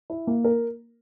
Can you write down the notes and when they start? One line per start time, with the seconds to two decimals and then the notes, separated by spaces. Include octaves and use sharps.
0.10 E4
0.27 A#3
0.44 A#4